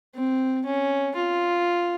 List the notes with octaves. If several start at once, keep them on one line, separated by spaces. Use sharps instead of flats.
C4
C#4
F4